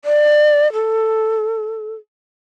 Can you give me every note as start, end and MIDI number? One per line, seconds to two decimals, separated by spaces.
0.05 0.71 74
0.73 1.94 69